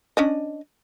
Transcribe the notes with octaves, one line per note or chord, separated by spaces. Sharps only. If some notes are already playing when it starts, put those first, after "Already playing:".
C#4 D4 D#5